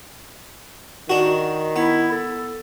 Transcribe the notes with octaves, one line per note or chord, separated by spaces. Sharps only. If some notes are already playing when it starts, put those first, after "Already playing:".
D#3 D4 F#4
B3 E4
A4